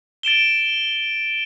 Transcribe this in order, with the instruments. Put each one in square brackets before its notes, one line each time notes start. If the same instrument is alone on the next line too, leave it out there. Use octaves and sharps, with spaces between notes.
[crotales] A6 D7 E7 G7